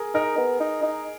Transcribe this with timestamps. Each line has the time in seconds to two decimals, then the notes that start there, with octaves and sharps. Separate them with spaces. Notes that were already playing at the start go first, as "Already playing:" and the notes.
Already playing: G#4 A#4
0.15 D#4 A#4
0.38 B3
0.60 D#4
0.83 D#4